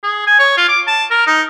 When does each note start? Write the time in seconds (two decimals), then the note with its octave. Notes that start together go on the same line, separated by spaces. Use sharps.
0.03 G#4
0.27 G#5
0.39 C#5
0.57 F4
0.68 D6
0.87 A5
1.10 A#4
1.27 D#4